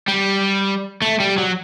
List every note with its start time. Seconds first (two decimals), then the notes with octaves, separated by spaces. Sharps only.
0.08 G3
1.02 A3
1.20 G3
1.38 F#3